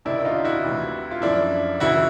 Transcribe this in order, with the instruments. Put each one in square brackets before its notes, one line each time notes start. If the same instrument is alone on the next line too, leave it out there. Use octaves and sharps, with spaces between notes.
[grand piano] C#2 C3 D#3 D4 E4
D#4 F4
E4 F#4
D2 C3 E3
F4
F#2 D3 F3 D4 E4
C#2 C#3 E3 E4 F#4